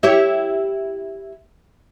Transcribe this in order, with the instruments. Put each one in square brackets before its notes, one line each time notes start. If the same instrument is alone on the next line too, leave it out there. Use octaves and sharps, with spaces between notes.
[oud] E4 G4 C#5